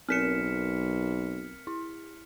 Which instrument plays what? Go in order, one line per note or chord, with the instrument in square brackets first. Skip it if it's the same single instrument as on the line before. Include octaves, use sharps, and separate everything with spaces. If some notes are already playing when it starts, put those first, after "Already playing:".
[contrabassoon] B1 [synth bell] C4 A#4 E7 [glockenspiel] F6 B6 C#7
[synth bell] E4